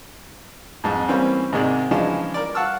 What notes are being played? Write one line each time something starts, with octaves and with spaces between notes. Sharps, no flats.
F2 G#2
E3 G3 A#3 C4 C#4
G#2 C3 D#3 G#3 D5
C#3 E3 F3 G#3 D4 D#4
A#4 D5
F5 F#5 A5 C#6 E6 F6